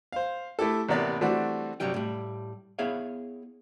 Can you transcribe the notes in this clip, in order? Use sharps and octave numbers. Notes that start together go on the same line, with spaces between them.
C5 F5
A3 E4 G4 A4
A1 C3 A#3 B3 D5 B5
E3 G3 A3 C4 D4 F#4
G2 C3 F#3 G3 G4
A2 G3
B3 E4 G#4 C#5 E5 F5